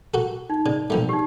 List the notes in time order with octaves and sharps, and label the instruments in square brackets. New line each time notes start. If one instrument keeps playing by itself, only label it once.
[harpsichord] F#4 A4
[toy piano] D#4
[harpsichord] C#3 [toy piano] D5
[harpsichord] B1 F3 A3
[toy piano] D#4 G4